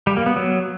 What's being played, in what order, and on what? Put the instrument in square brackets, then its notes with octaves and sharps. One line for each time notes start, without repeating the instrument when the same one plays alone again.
[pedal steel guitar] G3
A#3
B3
F#3